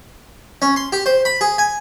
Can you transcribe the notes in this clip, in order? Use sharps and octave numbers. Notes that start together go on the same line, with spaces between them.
C#4
C6
G4
C5
B5
G#4
G#5